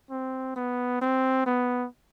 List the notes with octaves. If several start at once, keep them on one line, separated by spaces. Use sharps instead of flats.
C4
B3
C4
B3